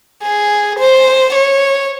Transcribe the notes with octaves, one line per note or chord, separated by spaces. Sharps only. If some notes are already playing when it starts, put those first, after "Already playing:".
G#4
C5
C#5